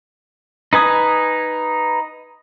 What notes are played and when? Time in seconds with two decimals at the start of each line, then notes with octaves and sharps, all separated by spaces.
0.73 D#4 B4 G#5 D#6